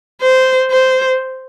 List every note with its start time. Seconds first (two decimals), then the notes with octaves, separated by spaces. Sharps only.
0.22 C5
0.71 C5